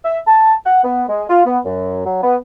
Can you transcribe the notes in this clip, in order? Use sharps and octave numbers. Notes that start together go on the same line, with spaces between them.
E5
A5
F#5
B3
G#3
F4
B3
F#2
F#3
B3